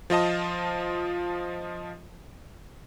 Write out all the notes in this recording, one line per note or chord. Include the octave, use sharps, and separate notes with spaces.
F3 F4 D#5 A5